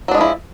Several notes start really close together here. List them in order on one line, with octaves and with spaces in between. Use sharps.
F#3 D4 G#3 F3 E4